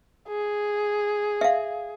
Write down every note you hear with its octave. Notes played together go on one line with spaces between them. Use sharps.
G#4
E5 F5